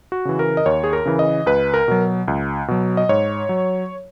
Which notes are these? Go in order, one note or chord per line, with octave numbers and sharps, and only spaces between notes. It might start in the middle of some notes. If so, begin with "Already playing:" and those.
F#4
C#3 E3
A#4
D#5
D#2 C#5
G#4
A#4
C#3 E3
D#5
C#2 B4
A#4
B2 F#3
C#2
B2 F#3
D#5
G#2 C#5
F#3